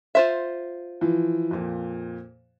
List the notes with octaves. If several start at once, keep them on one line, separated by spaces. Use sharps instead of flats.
F4 C5 E5
E3 F3
F2 A#2